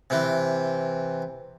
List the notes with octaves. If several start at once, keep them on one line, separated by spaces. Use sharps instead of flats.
C3 E3